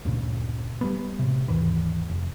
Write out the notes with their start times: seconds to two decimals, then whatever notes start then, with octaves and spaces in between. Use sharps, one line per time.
0.05 D2 G2 A#2 C#3
0.81 G3 G#3 B3
1.19 A2 C3
1.48 D#2 G#2 D#3 E3
2.10 F1